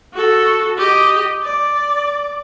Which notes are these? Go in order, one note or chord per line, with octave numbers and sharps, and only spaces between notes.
F#4 A4
G4 D#5
D5